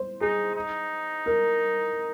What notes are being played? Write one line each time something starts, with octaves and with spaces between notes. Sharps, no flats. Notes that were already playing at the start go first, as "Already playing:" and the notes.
Already playing: C5
D#4 G#4
D#4
A#4